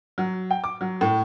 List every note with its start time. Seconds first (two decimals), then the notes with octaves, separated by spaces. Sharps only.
0.18 F#3
0.51 G5
0.64 D6
0.81 F#3
1.01 A2